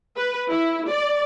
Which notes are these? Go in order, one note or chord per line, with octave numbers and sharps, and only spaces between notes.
B4
E4
D5